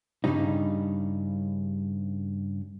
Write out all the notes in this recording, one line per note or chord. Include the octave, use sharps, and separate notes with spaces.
G2 A#2 C#3 G3 D#4